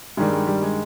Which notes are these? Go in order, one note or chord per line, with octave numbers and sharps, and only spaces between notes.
G2 D#3 G3 G#3
G#3
G3
G#3